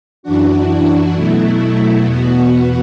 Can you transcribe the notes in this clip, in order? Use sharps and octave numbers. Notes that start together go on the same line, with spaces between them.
F#2 E3 D4 F#4
B2 F#3 A3 E4
E2 B2 B3 F#4